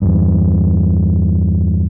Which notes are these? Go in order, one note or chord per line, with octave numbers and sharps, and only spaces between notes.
E2 G2